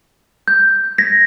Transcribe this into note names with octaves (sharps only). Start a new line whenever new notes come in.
G6
G#6 A#6 B6